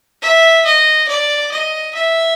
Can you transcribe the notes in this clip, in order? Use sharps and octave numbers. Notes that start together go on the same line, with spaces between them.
E5
D#5
D5
D#5
E5